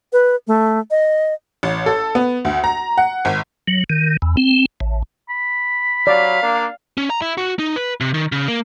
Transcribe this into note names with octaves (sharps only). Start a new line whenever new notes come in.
B4
A3
D#5
A1
A4
B3
D2
A#5
F#5
G#1
F#3
D#3
E2
C4
A1
B5
F#3 D5 F5
A#3 D4
C#4
A#5
E4
F#4
D#4
B4
C3
D#3
C#3
A#3